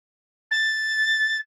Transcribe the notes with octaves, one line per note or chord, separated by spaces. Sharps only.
A6